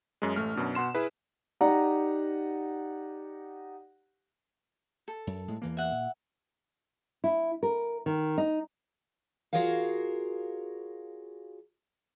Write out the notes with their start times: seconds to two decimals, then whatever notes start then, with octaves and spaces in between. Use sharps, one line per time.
0.22 F#2 G#3
0.36 A1 A3 F6
0.55 F#2 B2 D4
0.75 B2 F#5 C6 E7
0.95 E4 G#4 B4
1.61 D#4 G4 D5 F#5 A#5
5.08 A4
5.27 F#2
5.48 A2 G#3
5.62 E2 E3 A#3
5.77 E5 F#5
5.92 A#2
7.24 E4
7.63 A#4
8.06 D#3
8.38 D#4
9.53 F4 F#4 G#4 A#4 C#5 F5